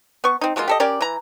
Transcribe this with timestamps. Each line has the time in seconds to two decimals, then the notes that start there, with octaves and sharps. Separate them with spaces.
0.24 B3 C#6
0.41 C4 D#4
0.56 F#3 G#3 A#3 F4
0.68 G4 A4 D#5
0.80 C#4 G4 A#4 D5
1.01 E3 A#5